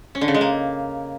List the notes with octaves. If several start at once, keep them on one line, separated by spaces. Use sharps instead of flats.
C#4
D3
C#3
G#3
A#3